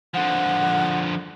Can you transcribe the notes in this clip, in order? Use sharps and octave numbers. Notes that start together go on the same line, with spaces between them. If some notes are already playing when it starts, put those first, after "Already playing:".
D3 F3 F#5